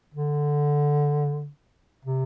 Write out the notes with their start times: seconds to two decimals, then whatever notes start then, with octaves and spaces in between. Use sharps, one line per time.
0.14 D3
2.05 C3